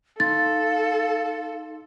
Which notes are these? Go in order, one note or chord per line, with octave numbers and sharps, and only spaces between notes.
D#4 A4 F5 C6 A6